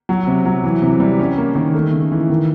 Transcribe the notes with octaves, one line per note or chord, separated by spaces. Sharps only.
F#3
C3
F#3
E3
C3
G3
C#4
A#3
D#3
A3
C#3
E3
D#3